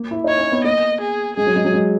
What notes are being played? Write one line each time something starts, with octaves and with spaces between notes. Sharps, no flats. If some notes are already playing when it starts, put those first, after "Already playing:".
Already playing: A#3
E4
D#4 C#5
C#4
B3
A#3 D#5
G#4
G#3 G#4
F#3
G#3
F#3
G#3